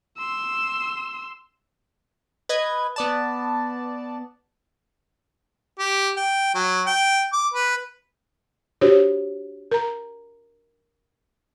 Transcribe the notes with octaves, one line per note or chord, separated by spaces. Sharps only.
C6 E6
B4 D#5 G#6
B3 D5 A5
G4
G5
F#3
G5
D6
B4
D4 F#4 G4 C5 C#5
A#4 A#5